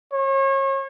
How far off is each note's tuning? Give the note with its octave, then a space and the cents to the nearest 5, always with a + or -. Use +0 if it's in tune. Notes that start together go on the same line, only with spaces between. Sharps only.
C#5 -35